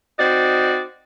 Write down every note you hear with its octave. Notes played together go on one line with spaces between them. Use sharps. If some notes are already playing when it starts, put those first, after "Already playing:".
C4 D#4 F#4 D5